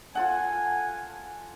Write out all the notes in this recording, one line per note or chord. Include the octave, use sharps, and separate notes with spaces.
F4 A4 F#5 G#5